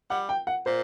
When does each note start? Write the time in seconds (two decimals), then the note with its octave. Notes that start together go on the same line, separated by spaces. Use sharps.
0.10 G3 F#5
0.29 G5
0.47 F#5
0.66 A#2 C5